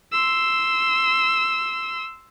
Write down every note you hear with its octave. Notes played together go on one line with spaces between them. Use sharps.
C6 E6